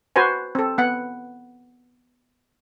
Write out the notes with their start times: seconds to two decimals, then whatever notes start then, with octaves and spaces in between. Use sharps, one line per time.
0.16 F#4 B4 C5 G#5
0.55 C4 A4
0.78 B3 F#5